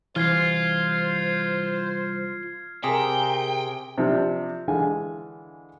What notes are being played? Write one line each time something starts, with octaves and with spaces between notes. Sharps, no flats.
C2 E3 F4 C5 F6 G#6 C7
C3 G#4 A#4 G5
C3 F3 D4
D3 E3 G#3 F5 G#5